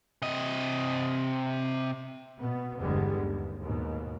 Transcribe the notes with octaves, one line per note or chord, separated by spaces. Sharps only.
C3 D#5
B2 B3
G1 E2 D3 G3 G#3 B3
D#2
D#2 G#2 B2